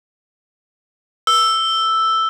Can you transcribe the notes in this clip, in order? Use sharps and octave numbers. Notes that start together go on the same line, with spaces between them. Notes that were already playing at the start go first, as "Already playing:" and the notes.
E6